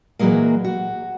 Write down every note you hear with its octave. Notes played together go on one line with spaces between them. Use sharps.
A#2 E3 F#3 G#3 A#3
F#4